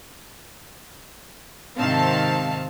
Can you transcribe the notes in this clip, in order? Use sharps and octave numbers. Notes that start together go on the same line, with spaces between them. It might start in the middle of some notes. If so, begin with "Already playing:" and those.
G#2 C3 D#3 C4 F5 A5